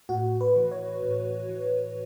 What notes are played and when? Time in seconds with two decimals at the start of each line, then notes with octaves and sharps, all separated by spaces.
0.09 A2 F#4
0.41 B4
0.56 E3
0.71 C#5
1.02 A2
1.49 E3